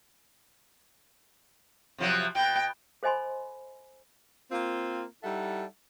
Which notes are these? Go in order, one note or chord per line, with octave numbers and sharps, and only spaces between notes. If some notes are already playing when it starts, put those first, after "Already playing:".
C3 F3 F#3
B2 G5
A4 C5 D#5 G#5 B5 C6
A#3 C4 F4
G3 D#4 E4 A4 E5 F#5